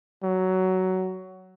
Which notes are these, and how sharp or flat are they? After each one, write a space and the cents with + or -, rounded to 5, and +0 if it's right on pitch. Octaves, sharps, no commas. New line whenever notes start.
F#3 +15